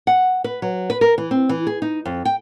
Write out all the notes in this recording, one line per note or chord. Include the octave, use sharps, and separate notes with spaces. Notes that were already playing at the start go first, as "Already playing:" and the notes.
F#5
B4
F#3
B4
A#4
E3
C4
E3
G#4
D#4
F2
G5